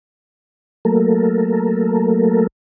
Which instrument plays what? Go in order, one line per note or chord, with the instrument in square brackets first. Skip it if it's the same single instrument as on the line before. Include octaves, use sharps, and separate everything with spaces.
[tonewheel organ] F#3 A3 A#3 A4 A#4